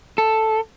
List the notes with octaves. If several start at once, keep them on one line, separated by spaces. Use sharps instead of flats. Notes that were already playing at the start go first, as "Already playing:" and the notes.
A4